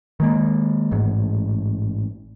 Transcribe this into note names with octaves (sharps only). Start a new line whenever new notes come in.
D#3 G#3 A#3
A1 G#2